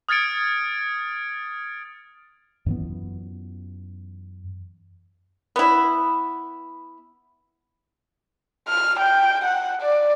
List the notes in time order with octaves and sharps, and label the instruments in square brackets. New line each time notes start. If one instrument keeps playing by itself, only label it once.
[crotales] D#6 F6 G#6 A6 C#7 D7
[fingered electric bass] F#2 E3 B3
[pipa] B3 E4
[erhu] F6
G5
F#5
D5